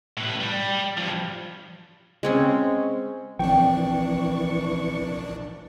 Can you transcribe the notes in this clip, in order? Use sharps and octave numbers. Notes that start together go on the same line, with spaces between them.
A2 B4
G3
G2 F3
G#3 C4 C#4
A#1 E3 F3 C4 D4 G5 C#6